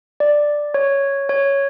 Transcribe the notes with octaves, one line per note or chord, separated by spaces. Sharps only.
D5
C#5
C#5